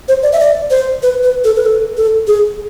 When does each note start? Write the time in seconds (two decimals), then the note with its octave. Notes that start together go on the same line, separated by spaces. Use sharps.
0.08 C5
0.23 D5
0.33 E5
0.40 D5
0.71 C5
1.03 B4
1.23 B4
1.44 A4
1.56 B4
1.66 A4
1.97 A4
2.28 G#4